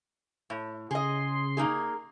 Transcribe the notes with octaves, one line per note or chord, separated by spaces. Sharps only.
A2
C#3 G#4 D#5 C6
A#3 D#4 G#4